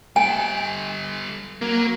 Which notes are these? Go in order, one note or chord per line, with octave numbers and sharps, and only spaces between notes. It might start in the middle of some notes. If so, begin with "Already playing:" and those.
G3 A4 G#5
F#3 A#3